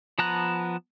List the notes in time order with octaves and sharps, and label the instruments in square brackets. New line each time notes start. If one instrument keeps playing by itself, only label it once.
[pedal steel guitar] F3 B3 A5 A#5 F#6